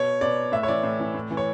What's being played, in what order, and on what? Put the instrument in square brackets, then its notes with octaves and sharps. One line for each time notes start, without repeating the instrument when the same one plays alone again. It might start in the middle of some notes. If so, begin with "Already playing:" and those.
Already playing: [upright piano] B2 C#5
B2 D5
A2 E5
C#5
E3 D5
A2
E3
A2
E3
C#5